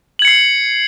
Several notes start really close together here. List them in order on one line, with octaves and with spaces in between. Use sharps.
F#7 G#6 C#7 C7